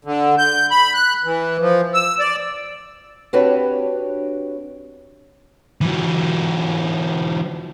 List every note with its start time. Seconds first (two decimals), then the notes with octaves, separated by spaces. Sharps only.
0.05 D3
0.38 G6
0.71 B5
0.94 F#6
1.24 E3
1.60 F3
1.94 E6
2.20 D5
3.33 C4 D4 F#4 G4 B4 C#5
5.81 E3 F#3